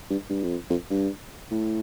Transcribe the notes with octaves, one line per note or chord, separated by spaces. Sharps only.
G2
G2
F2
F2
G2
A2